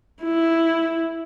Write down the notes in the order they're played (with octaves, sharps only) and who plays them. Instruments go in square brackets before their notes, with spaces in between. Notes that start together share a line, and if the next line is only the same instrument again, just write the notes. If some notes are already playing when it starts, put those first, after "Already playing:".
[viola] E4